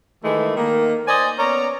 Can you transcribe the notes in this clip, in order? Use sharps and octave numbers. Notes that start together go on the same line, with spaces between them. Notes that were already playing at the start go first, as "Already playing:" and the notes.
D#3 E3 G#3 A3
D#3 A#3
C5 D5 D#5 G#5
B3 C#4 D5 A#5